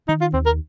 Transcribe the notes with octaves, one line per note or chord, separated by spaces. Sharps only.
D#3 D#4
F4
D#2 C4
A#4